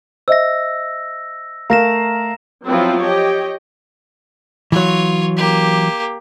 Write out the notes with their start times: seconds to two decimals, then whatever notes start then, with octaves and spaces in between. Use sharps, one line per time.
0.28 C5 D#5 E5 E6 A#6
1.70 A3 A#4 F5 A#5 A#6 E7
2.67 F3 F#3 B3 C4 E4 F4
3.00 G4 C#5 D#5 G5
4.72 E3 F#3 F4 C#5
5.37 A#3 G4